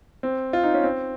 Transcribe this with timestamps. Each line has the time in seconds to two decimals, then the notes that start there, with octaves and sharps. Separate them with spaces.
0.23 C4
0.53 F4
0.63 D#4
0.74 C#4
0.83 C4